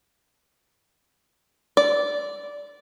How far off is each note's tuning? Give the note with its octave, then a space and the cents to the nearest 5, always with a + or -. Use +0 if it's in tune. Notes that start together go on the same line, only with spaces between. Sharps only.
D5 -15